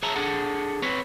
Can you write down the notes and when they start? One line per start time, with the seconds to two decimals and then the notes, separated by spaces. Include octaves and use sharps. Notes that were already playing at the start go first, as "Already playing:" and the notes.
0.03 G#4 C#5 E5 A5 A#5
0.16 D4 G#4 A4 F#5
0.82 C4 B4 C#5